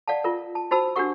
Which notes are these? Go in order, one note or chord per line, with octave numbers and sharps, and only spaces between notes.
D5 F5 F#5 A5
F4 A#4
A5
D#4 F#4 C5 A5 B5 E6
D4 F#4 G4 A#4 F#5 C#6